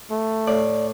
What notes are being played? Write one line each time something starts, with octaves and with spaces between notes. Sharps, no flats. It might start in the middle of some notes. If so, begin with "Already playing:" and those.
A3
A2 D5